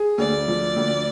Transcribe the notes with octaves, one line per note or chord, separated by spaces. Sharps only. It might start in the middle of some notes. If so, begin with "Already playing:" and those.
Already playing: G#4
D2 D5
F3
D2